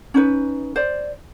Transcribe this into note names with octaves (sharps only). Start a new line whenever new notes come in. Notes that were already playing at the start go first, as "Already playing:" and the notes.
C#4 D#4 B4
C5 D5